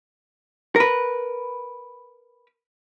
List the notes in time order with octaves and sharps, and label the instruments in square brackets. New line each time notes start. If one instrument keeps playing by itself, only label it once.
[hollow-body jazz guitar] A#4 B4